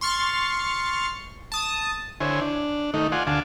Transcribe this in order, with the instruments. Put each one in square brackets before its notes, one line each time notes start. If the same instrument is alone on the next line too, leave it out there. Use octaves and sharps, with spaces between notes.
[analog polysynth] C6 C#6 F6 A6
A5 D#6
[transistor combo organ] D3 E4 C5 C#5 G#5
D4
D#3 A3 D#4
F4 D5 F#5 G#5 C6
D2 D3 F5 G#5 A5 D6